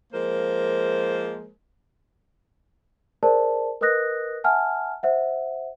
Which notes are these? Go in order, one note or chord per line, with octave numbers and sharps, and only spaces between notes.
F3 G#3 A#3 A#4 C5
G#4 A#4 C5 D5 A5
A#4 B4 D#5 D#6 F#6 A#6
E5 F#5 G#5 A5 F6
C5 E5 F#5